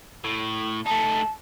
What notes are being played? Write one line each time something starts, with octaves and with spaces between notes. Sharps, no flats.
A2
A3 D#4 A5